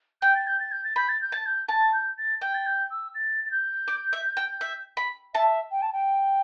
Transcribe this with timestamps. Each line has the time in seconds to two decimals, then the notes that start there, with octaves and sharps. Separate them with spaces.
0.22 G5 G6
0.35 A6
0.47 G6
0.60 A6
0.72 G6
0.84 A6
0.96 B5 G6
1.09 A6
1.21 G6
1.32 A5 A6
1.46 G6
1.68 A5 A6
1.93 G6
2.18 A6
2.41 G5 G6
2.54 A6
2.66 G6
2.91 E6
3.15 A6
3.46 A6
3.51 G6
3.88 D5
4.13 E5
4.37 G5
4.61 E5
4.97 B5
5.34 E5 A5
5.71 G5
5.82 A5
5.93 G5